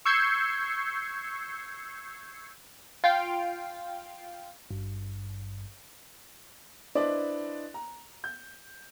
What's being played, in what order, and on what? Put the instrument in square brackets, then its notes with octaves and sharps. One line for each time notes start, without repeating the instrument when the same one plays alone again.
[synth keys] C#6 E6 G6 G#6 C7 C#7
[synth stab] F4 F5 G5
[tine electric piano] G#1 G2
[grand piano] D4 E4 B4 C5 D5 D#5
A#5
G6